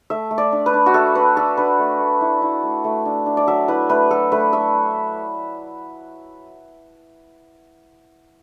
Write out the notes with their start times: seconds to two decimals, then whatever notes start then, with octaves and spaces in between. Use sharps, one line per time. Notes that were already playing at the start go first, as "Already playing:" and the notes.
0.10 A3 E5
0.31 A3
0.38 D5
0.52 D4
0.66 B4
0.74 D4
0.86 F#4
0.94 A3 A4
1.15 A3 B4
1.37 D4 A4
1.57 D4 B4
1.79 A3
2.00 A3
2.21 E4
2.42 E4
2.63 A3
2.84 A3
3.06 D4
3.26 D4
3.37 D5
3.47 F#3 E5
3.68 E4 B4
3.89 A3 B4
4.11 F#3 A4
4.32 A3 B4
4.53 A3 E5